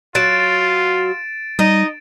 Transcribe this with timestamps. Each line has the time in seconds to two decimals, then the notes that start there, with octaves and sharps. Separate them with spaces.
0.15 F#3 F4 A6 D7 E7
1.59 G3 D#4 D#5